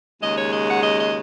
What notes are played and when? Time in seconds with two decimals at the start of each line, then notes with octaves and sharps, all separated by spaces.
0.20 D#2 C#3 G#3 D#5
0.36 C#5
0.52 D#5
0.67 F#5
0.83 D#5
0.99 D#5